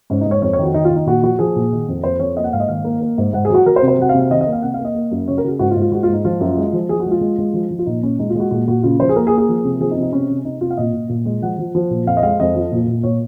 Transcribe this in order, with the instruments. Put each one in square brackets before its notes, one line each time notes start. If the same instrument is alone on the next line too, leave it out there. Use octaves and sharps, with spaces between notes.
[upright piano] G#2 C#4
D#4
G#2
C#5
F2 C#5
C#5
D#3 F#4
D#3 D#4
F4
D#3
D#4
A#2 F#4
F3 F#4
F3 G#4
A#2
D#3
F2
F2 C5
F2 C#5
A#3 D#5
F#5
G#2 F5
D#5
D#3 F5
A#3
A#3
G#2
G#2 F#5
G#4
F#3 F#4
F#3 A#4
C5
C3
C5
F#3 F#5
F5
C3
F5
D#3 D#5
D#5
A#3
F5
C3 F#5
F5
A#3
D#5
A#3
F#2
C#3 C#5
A#4
C#3 F#4
G#4
G#2 F#4
F4
G#2
F4
G#3 F#4
F4
G#2 D#4
F3 F4
F#2
G#3
F3
F3 G#4
F#4
G#3
F4
G#3
G#3
F3
F3
F4
A#2 D#4
A#2 C#4
G#3 D#4
F4
G#3 F#4
A#2 F#4
A#2 F#4
C#3 F4
F3 C5
G#4
A#3 A#4
G#4
A#3
G#4
F3
C3
F3 G#4
D#4
C3
D#4
C3 C#4
C3
C3 D#4
C3 F4
F5
A#2 D#5
A#2
A#2
G#3
F3 F#5
F3
F3
A#2
F2 F5
D#5
G#3 F5
F2 D#5
F3
A#2
A#2
A#2 C#5